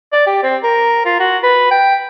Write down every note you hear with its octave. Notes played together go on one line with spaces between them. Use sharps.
D5
G4
C4
A#4
F4
F#4
B4
G5